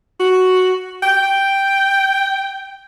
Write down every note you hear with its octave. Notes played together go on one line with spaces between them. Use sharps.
F#4
G5